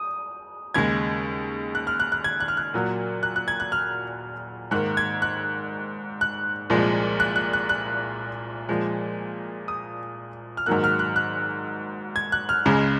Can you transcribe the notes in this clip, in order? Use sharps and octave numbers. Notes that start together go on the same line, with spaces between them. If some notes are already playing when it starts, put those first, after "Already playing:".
Already playing: D#6
D#2 C#3 G#3 G#6
F#6
F6
F#6
F#6
G#6
F#6
F6
F#6
A#2 F#3 A#3
F#6
F#6
G#6
F#6
F6
G#2 D#3 A#3 F#6
G#6
F#6
F#6
C2 A#2 F3 G#3
F#6
F#6
F#6
F#6
A#2 F3 G#3
D#6
F6
G#2 D#3 F#3 A#3 F#6
F6
F#6
F#6
G#6
F#6
F6
C#2 C#3 G#3